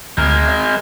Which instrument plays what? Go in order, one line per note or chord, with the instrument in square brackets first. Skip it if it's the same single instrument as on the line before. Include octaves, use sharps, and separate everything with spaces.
[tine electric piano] D2 [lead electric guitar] G#3 A#4
[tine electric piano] D#5